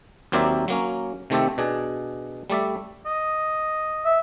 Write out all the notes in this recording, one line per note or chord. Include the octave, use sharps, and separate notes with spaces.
D#2 F#3 C4 A#4 D5 E5
F#3 A#3 C#4
C3 D#3 A3 C4 G4 A4
B2 D4 G#4
G3 A3 D5 E5
D#5
E5